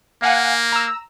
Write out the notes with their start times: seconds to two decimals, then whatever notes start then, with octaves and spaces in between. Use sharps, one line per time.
0.22 A#3 F5 F#5 G#5
0.72 A#5 E6